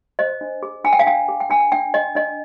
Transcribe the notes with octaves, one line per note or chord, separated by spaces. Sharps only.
C5 D#5
D4
G#4
D4 G#5
G5
F5
D4 G5
G#4
G5
D4 G#5
D4 G5
D4 D#5
D4 D#5